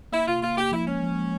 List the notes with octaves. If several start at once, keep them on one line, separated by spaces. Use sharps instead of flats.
A#3 E4
C3 F4
A#3 F4
A#3 G4
F3 E4
G#3 C#4
F3
G#3